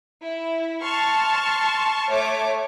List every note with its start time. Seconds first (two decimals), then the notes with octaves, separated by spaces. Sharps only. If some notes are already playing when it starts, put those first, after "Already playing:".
0.23 E4
0.83 A5 C6 C#6 F6
2.08 A3 C#5 D6